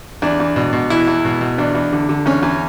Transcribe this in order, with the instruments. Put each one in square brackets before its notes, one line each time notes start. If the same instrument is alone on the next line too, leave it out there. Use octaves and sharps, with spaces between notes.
[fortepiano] E2 D4
E2
B2
B2
E2 E4
E2
B2
B2
E2 D4
E2
D3
D3
E2 C#4
E2